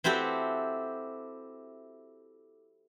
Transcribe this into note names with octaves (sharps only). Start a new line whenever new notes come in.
C4 E4 F#4 G4 A4